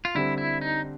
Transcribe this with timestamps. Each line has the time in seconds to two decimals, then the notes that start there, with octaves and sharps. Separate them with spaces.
0.05 F4
0.15 D3 G3 C4 E4
0.38 E4
0.61 D#4